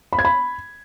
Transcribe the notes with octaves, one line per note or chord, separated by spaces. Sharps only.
B5
G#6
B5